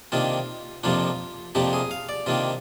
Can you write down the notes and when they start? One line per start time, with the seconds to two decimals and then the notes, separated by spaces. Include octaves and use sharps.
0.12 C3 D#3 A#3 D4 F4
0.83 F2 C3 F3 A#3 D4 F4
1.55 F2 C3 F3 A#3 D4 G4
1.73 G#4
1.91 F5
2.09 D5
2.26 C3 D#3 A#3 D4 F4